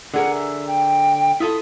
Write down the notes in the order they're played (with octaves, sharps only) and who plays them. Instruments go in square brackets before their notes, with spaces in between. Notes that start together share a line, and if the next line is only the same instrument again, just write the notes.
[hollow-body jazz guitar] D3 G#4 A#4 [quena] F#5
[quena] E5
G5
[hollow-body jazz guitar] E4 F4 A4 [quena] D#6